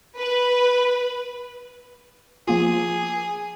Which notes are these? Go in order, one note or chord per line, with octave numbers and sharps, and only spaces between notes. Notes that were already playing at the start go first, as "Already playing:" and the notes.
B4
F3 A#3 F4 G#4